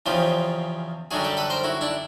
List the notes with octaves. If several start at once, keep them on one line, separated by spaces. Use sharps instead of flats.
E2 C#3 F3 F4 G4
F#2 D3 G3 F#4 G#4
G4 A4
A4 B4
A#4 C5
E4 F#4
D4 E4